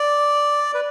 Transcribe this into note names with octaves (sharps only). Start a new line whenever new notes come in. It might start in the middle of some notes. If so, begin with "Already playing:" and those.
Already playing: D5
B4